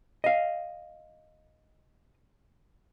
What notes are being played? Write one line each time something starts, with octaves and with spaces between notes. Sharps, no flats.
D#5 F5